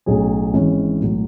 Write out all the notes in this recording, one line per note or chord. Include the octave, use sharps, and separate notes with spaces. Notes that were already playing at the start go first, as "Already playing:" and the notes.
B1 A2 F#3 C#4 G#4
G#1 G#2 E3 G#3 C#4
B1 A2 F#3